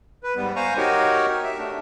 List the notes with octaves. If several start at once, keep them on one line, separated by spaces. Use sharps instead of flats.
B4
G#2 G3 B3
C5 F5 G#5 A#5 C#6
D#4 F#4 G4 A#4 C#5
E5
A3 D4